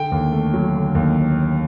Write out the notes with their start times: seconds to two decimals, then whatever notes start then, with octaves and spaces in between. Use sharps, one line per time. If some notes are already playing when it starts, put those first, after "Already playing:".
Already playing: D3 G5
0.12 D#2
0.32 A3
0.53 F#3
0.74 D3
0.95 D#2